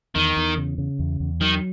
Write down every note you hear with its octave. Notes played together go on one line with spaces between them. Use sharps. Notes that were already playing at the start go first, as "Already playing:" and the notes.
E2 D#3
E2
C#3
C#3
E2
E2
D#3 F#3